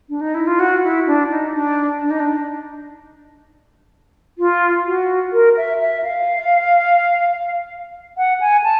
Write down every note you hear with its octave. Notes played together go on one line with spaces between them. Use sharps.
D4
D#4
E4
F4
F#4
E4
D4
D#4
D4
D4
D#4
D4
F4
F#4
A#4
E5
E5
F5
F#5
G#5
A5